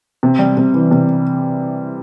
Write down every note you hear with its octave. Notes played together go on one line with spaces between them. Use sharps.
C3
G3
C3
E3
C3